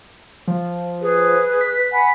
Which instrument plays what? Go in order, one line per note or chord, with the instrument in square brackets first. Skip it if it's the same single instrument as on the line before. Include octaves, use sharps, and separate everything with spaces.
[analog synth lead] F3
[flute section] G#4 [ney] B4
[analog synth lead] B6
[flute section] F#5 G#5 B5